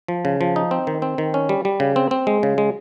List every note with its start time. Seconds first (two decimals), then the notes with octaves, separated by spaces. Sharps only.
0.08 F3
0.25 C#3
0.41 F3
0.56 D#4
0.71 C4
0.87 D#3
1.02 C4
1.18 D#3
1.34 C#4
1.49 G3
1.65 G3
1.80 C#3
1.96 C4
2.11 C4
2.27 G#3
2.43 C#3
2.58 G#3